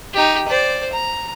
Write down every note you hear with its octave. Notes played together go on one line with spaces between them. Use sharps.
D#4 G4
C5 D5
A#5